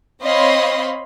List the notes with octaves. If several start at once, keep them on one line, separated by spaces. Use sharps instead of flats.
C4 C#5 D#5 F5 B5 C6